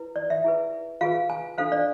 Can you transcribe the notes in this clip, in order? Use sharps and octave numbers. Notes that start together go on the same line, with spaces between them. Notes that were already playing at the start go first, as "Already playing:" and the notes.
Already playing: E4 B4
D5
E5
E4 G#4 B4
F4 G#4 B4 F5
G#5
D4 A4 C5 F5
D5